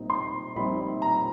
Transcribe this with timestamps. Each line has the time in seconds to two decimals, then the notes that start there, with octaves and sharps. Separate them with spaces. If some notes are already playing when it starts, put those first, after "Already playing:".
Already playing: A#1 A#2 G3 C4 D#4
0.10 C6
0.56 A#1 A#2 G3 C4 D#4 B5
1.02 A#5